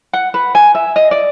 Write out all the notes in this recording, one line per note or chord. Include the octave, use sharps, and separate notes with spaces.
F#5
B4
G#5
E5
D#5
D5